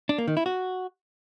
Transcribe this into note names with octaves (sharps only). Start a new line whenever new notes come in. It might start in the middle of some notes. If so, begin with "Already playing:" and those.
D4
A#3
D#3
E4
F#4